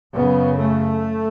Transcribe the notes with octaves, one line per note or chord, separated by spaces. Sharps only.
F#2 C#3 B3
A3